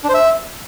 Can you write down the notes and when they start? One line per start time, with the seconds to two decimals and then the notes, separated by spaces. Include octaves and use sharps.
0.04 D4
0.09 C5
0.14 E5